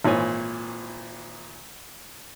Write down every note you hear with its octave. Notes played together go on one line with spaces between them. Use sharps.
G#1 A#2 E3 C#5 G#5